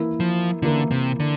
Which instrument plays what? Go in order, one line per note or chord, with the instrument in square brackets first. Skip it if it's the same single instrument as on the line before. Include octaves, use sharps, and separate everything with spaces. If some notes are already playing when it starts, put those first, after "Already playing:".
Already playing: [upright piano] E3 A#3 E4 A#4
[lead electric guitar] F3
[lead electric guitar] D3 [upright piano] E3 A#3 E4 A#4
[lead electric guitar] C3
D3